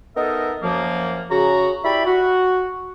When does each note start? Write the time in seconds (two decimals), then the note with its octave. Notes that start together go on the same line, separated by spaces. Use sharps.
0.17 B3 D#4 A4 A#4 D#5 E5
0.63 F#2 F3 A#3
1.30 C#3 F#4 A#5
1.85 E4 G4 D5 E5 B5
2.06 F#4